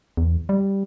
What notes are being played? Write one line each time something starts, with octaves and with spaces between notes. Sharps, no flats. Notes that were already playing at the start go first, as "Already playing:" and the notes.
E2
G3